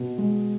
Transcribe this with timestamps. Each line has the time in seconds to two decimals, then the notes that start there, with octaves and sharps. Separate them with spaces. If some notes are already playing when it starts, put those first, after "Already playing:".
Already playing: B2
0.18 G#3